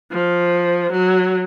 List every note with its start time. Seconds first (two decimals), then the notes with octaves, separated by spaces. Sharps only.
0.12 F3
0.92 F#3